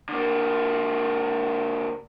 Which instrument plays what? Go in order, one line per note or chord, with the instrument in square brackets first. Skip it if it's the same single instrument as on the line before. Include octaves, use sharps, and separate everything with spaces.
[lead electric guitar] D3 A#3